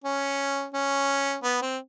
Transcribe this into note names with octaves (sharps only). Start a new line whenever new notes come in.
C#4
C#4
B3
C4